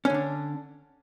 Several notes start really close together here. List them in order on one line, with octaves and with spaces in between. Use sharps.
C#4 D3 D4